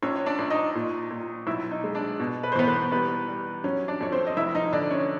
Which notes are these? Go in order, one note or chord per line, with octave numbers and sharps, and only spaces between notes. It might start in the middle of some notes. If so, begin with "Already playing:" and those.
A#1 C#4 C#5
C#5
D4 D5
A#1
D#4 D#5
A#2
A#2
B1 E4 E5
D#4 D#5
G#3
D4 D5
B2
B4
C5
E2 B3 B4
B3 B4
G3 B3 B4
G3
F#3 C#4 C#5
D4 D5
F2 C#5
C4 C5
D#5
F1 E4 E5
D#4 D#5
D3 D4 D5
C#4 C#5